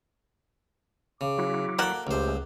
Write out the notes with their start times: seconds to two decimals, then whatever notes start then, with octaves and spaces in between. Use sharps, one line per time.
1.21 C#3 D6
1.38 F#3 E4 F#4
1.79 A#3 A4 D5 F#5 G5
2.07 C#2 G#3 A3 G4 C5